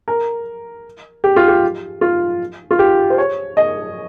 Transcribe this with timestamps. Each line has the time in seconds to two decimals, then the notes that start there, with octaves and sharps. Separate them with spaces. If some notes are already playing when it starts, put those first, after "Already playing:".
0.08 A#4
1.24 G4
1.36 F4
1.48 G4
2.01 F4
2.71 F4
2.79 G4
3.10 C5
3.18 C#5
3.57 D#5